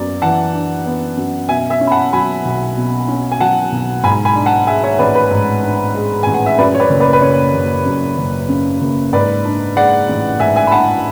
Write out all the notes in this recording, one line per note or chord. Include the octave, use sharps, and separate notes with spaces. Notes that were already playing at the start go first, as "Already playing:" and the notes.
Already playing: F#2 B3 D5
E3 F#5 A5
D4
B3
F#2
B2 E5 G#5
E5 G#5
C#4
B5
F#5 A5
F#3 G#5 B5
B1
B2
C#4
G#5
F#3 F#5 A5
B1
G#2 G#5 B5
G#5 B5
D4
F#5 A5
G#3 E5 G#5
C#5 E5
A1 B4 D5
B4
G#2
D4
G#3
A1 G#5
F#5
E5
F#2 B4 D5
C#5
B4 D5
F#1
B4 D5
B4
C#3 C#5
F#1
F#2
F#1
C#3
F#1
G#2 B4 D5
D4
G#3 D5 F#5
A1
G#2 E5 G#5
E5 G#5
B5
D4 F#5 A5